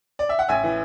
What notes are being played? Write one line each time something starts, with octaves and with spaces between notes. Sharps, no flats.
D5
E5
F#5
A1 E5 G#5
E3